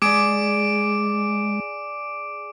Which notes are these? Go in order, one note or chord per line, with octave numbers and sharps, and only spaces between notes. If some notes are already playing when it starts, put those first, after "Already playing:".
G#3 G#4 D5 D6 D7